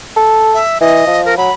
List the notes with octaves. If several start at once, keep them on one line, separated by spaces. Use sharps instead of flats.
A4
E5
E3 D#5
F3
A#4
F#3 B5